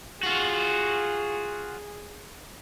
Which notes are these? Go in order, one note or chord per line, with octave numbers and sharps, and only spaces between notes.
F4 F#4 G#4